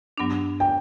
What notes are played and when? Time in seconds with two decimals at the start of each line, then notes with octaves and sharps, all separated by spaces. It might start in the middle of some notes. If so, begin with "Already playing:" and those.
0.18 G2 F#3 B3 D4
0.60 G5